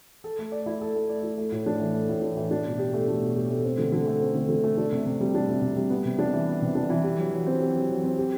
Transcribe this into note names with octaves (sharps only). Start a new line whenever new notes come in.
A4
A3
D5
E4
A4
A3
D5
E4
A3
A2
D4
E3
A3
A2
D4
E3
D4
B2
G4
A3
D4
B2
G4
A3
C4
D3
D3
A3
C4
D3
D3
A3
D4
C3
C3
G3
D4
C3
C3
G3
B3
C3
D4
E3
B3
C3
D4
E3
G4
F#3
F#3
C4
G4
F#3
F#3
C4
G4